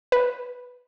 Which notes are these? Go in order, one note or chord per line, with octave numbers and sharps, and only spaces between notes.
B4